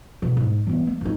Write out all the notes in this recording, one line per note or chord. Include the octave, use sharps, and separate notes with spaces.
B2 E3
G#2
E3 B3
A#3
G#2 D#4